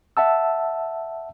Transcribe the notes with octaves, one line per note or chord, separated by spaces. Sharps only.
E5 F#5 A5 E6